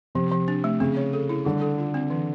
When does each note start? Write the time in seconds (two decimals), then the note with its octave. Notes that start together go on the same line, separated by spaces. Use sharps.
0.15 C3 F3
0.32 F3
0.48 D4
0.64 A3
0.80 C#3 C4
0.97 C#5
1.13 A4
1.29 E4
1.45 D3 G3
1.61 A4
1.78 F4
1.94 C4
2.10 E3